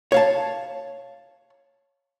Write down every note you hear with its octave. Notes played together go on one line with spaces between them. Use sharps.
C#5 F5 A5